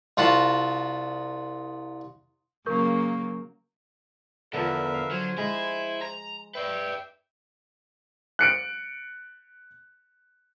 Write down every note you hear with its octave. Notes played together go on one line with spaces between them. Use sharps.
C2 F4 F#4 A5 B5
C#3 F#3 A#3 A#4 C#6 G6
E2 D3 F3 A#4 B4 E5
F5
F#3 C5 G#5
G#3 E4
A#5
B4 D5 E5 G5
F#6 C#7 D7